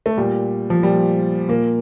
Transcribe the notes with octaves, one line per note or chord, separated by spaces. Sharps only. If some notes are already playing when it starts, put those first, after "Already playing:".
A3
A#2 G3
F3
A#2 G3
A#2 A#3